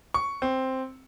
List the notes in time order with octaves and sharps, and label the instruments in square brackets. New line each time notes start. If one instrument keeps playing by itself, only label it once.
[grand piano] C#6
C4